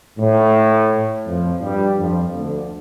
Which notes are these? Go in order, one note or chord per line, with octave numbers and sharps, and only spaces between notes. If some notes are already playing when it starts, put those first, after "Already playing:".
A2
F2 F3
G2 G3
F2 F3
D2 D3